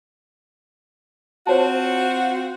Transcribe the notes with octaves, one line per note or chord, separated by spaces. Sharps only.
C4 F4 F#4 C5 C#5 A5